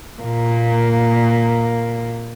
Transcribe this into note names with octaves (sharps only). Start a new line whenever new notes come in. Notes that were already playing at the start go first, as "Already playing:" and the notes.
A#2 A#3